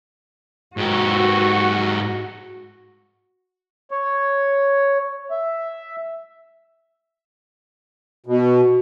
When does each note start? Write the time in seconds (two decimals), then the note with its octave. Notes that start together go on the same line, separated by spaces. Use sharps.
0.77 G#2 F#4 G4
3.91 C#5
5.31 E5
8.26 B2